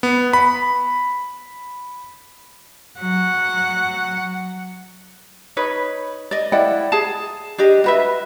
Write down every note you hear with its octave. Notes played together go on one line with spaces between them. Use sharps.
B3
B5
F#3 F#5
D#4 B4 C#5
D5 D#5
E4 D5 F#5 G5
G#4 A5
D4 G4 D#5
F#4 B4 E5